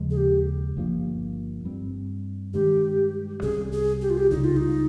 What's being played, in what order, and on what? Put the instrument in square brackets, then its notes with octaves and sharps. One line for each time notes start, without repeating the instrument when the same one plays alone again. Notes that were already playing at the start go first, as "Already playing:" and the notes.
Already playing: [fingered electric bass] D#2 C#3 F3 G#3
[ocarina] G#4
G4
[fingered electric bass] G1 G2 F3 A#3
G2 G3 C4
[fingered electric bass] G2 D#3 G#3 [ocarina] G4
[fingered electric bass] C2 C3 G3 C#4 [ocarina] G#4
[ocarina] G#4
G4
F4
G4
[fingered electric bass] C#2 C#3 G3 [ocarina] D#4
[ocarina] F4
D#4